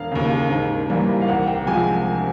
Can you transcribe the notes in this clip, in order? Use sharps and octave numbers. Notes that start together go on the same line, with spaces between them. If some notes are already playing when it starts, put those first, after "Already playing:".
Already playing: E1 F5
D#2 C#3
G#2
E3 G3 A#3
F5
C2 F#5
G5
C3 F3 G#3 G#5